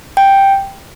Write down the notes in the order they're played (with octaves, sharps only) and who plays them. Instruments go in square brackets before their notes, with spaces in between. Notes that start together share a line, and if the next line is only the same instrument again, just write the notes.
[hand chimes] G5